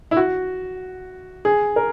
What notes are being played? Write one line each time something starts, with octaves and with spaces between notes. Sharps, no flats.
E4
F#4
G#4
A#4